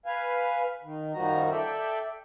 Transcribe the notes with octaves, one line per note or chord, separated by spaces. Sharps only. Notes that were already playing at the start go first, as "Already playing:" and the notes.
B4 F5 G#5
D#3
F#2 D#3 F3 G3 F#4 A#5
A4 D5 E5 G5